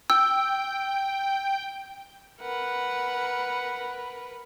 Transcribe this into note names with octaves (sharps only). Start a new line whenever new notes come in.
G5 E6
A#4 B4 F#5